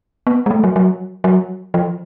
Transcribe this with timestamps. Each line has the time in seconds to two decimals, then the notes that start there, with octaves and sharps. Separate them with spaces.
0.27 B3
0.46 G#3
0.51 A3
0.64 F#3
0.76 F#3
1.24 F#3
1.74 F3